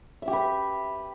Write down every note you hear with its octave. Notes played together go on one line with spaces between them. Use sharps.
E5
G4
B4